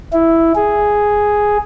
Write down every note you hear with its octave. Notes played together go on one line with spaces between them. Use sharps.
E4
G#4